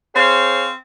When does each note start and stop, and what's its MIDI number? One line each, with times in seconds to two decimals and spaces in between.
0.15 0.71 60
0.15 0.71 68
0.15 0.71 72
0.15 0.71 73
0.15 0.71 77